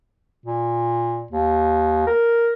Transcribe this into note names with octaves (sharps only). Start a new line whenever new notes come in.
A#2
D#2
A#4